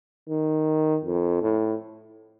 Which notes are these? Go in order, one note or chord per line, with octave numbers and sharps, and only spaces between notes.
D#3
F2
A2